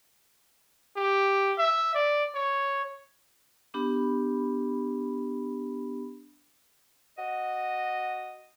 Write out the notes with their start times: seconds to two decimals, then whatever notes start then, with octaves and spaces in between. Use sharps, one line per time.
0.97 G4
1.58 E5
1.94 D5
2.35 C#5
3.74 B3 D4 G4 B5
7.18 F#4 D#5